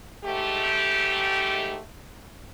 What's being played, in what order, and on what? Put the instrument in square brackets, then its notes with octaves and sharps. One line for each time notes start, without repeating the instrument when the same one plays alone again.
[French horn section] G#2 A3 G4